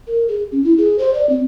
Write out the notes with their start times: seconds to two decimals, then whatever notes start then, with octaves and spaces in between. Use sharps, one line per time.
0.07 A#4
0.28 G#4
0.52 C#4
0.64 E4
0.78 G#4
0.99 C5
1.14 D5
1.29 C4